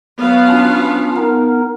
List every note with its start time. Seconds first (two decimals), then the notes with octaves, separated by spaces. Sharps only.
0.18 F#3 B3 F5
0.49 C#4 D4 F4
1.16 B3 D#4 A#4